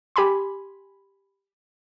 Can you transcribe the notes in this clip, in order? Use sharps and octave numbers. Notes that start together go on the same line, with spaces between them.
G4 G#5 B5 C6